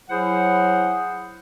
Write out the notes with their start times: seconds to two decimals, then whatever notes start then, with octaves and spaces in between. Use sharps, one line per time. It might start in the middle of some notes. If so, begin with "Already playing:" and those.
0.10 F#3 E4 G#4 C5 F#5